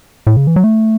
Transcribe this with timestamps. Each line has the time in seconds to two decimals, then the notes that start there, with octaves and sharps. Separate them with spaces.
0.27 A2
0.37 C#3
0.47 E3
0.56 F#3
0.64 A3